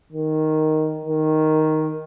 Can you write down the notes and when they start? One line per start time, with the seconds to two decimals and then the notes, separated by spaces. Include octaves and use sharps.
0.12 D#3
1.06 D#3